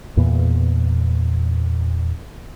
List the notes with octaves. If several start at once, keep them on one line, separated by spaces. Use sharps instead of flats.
E2 A#2 B3